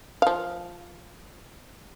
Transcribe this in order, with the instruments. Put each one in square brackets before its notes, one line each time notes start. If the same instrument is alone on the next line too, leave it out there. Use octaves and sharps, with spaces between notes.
[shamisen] F3 F5